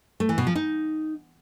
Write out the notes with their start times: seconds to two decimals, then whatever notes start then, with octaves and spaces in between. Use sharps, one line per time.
0.20 A3
0.29 E3
0.38 B2
0.47 F3
0.56 D#4